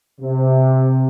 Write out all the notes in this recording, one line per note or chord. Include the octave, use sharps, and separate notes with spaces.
C3